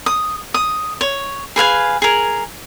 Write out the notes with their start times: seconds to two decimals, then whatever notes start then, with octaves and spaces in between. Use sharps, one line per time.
0.06 D#6
0.54 D#6
1.01 C#5
1.56 G#4 B4 F5 G#5
2.02 G#4 A#4